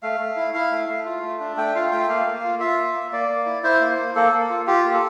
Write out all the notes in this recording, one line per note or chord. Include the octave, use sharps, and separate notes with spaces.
A3 F5
A3
E4
E4 F5
A3
A3
F4
A3
D4
A3 G5
F4 F5
A3 G5
A#3 F5
A#3
F4
F4 E5
A#3
A#3
A#3 D5
A#3
E4
E4 C5
A#3
A#3
A#3 A4
A#3
F4
F4 G4
A#3
A4